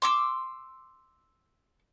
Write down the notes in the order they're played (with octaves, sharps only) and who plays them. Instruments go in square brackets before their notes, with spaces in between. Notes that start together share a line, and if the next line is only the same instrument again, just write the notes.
[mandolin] C6 D6 E6